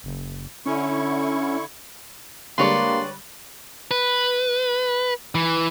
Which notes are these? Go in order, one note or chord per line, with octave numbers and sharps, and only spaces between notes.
F#1
D3 C#4 E4 C#6
D3 G3 G#3 A#3 B4 C#5 D5 C6
B4
E3